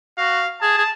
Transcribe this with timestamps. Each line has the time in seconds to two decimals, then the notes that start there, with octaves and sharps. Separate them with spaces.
0.18 F#4 F5
0.61 G#4 A5
0.78 G#4